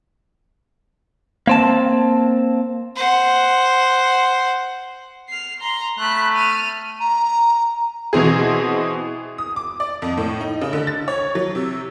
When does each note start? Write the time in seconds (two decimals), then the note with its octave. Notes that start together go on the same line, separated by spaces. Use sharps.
1.47 A#3 C4 A5
2.96 C5 F#5
5.29 F6 C7
5.60 A#5 C6
5.99 A3 B5 F#6
6.35 F6 D#7
7.00 A#5
8.13 B2 E3 C4 G#4
9.38 D#6
9.56 D6
9.80 D5
10.02 F2
10.17 A2
10.41 D#4
10.61 C#3
10.73 D3
10.87 A6
11.08 C#5
11.35 F#3
11.55 C3